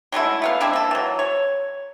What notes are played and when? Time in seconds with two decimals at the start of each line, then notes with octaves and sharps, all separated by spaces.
0.12 F#3 G#3 A3 E4
0.42 A3 B3 F5
0.61 G#3 C4 D4 E4
0.73 A#3 A4
0.91 E3 F#3
1.19 C#5